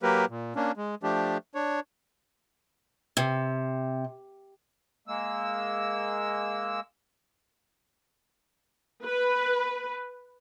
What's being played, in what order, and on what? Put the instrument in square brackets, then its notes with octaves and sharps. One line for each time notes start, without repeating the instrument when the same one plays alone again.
[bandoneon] F#3 A#3 G4 A#4 B4
A#2
A#3 C#4 D4
G#3
F3 A3 D4 G4
D4 C#5
[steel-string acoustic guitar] C3
[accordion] G#3 A#3 E6
[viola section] B4